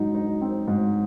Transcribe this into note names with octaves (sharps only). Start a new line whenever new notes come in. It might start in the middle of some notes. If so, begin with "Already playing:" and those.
Already playing: G#2 F#3 D#4
D#4
C4
G#2